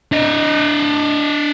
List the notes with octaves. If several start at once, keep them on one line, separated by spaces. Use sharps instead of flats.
D4 D#5